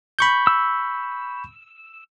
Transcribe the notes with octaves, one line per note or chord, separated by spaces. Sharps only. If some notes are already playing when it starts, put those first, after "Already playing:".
B5 C#6 G6
E6